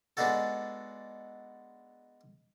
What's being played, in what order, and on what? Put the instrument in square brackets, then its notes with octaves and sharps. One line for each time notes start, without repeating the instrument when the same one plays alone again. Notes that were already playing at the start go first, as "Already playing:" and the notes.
[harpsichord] G#3 B3 D4 D#4 F#4 A4